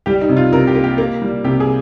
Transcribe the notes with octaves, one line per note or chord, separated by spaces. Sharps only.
G3 G4
D#4
C3
F4
C3 A#4
G4
A#3
G4
A#3
G3
C3 G4
G#4